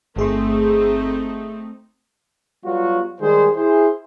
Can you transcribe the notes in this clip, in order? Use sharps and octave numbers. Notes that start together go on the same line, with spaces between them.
G1 A3 C4 D#4 G#4 C6
F#3 G3 B3 F4 F#4
D#3 G3 G#3 G#4 C5
E4 G#4 C5